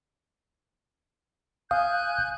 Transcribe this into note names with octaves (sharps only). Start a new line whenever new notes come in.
F5 G#5 D#6 F#6 G6